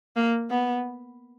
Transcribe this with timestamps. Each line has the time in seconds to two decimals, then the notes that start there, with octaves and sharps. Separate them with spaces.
0.16 A#3
0.50 B3